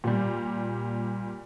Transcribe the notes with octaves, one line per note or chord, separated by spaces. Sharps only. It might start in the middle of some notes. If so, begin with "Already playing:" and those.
A#2 G3